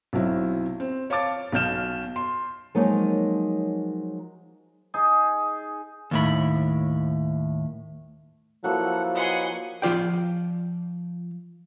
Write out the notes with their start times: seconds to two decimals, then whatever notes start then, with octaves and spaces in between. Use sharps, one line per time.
0.13 B1 F#3 C4 E4
0.80 C4
1.10 C#5 F5 A5 D6 A6
1.52 B1 B2 F6 G6 E7
2.16 C6
2.75 F3 F#3 G#3 A#3 D#4 C#5
4.94 D#4 G#4
6.11 D#2 A2 B5
8.64 F3 F#3 A#3 E4 A4 F#5
9.16 B4 D#5 F#5 G#5 C6
9.82 F3 F4 D5 G5